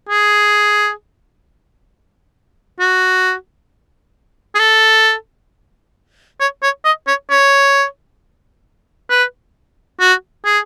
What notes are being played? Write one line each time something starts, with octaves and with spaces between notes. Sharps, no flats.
G#4
F#4
G#4
A4
C#5
C#5
D#5
C#5
C#5
B4
F#4
G#4